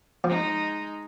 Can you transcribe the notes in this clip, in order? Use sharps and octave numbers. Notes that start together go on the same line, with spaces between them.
F3 G#3 D#4